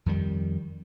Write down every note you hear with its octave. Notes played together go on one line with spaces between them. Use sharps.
F2 D#3 G3